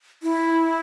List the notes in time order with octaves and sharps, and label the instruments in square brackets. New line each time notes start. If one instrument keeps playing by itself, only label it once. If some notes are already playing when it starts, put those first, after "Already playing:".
[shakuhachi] E4